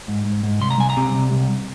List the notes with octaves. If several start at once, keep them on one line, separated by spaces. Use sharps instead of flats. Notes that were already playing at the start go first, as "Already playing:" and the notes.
G#2
G#2
G#2
C2 C6
A#5
C2 G#5
A#5
C3
C2
C2